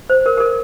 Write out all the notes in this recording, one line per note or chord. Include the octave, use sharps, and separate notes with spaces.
C5
A#4
A#4
A4